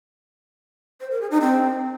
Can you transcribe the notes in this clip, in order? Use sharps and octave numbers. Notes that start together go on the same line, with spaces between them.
C5
A#4
G#4
D#4
C4